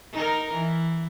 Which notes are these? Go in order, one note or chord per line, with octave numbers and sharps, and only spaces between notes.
D#4 A#4
E3